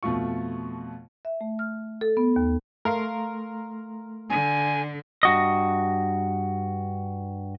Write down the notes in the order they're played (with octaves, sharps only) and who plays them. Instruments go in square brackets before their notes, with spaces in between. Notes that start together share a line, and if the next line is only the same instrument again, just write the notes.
[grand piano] F2 B2 A3 F4 C#6
[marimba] E5
A3
F6
A4
B3
D#2
[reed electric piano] A3 C6 [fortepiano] A#4 F5
[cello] D3 [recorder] G#5
[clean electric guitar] G2 F#4 D#5